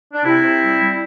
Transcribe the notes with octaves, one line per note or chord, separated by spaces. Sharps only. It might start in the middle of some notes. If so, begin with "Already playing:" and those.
D4
C3 C4 E4
C3
G3
G3